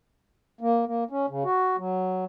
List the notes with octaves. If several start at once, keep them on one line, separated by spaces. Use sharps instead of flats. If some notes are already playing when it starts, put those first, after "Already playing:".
A#3
A#3
C#4
C#3
F#4
F#3